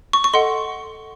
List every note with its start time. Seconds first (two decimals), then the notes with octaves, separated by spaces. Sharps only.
0.13 C#6
0.24 C#6
0.34 A4 D#5 F#5 C6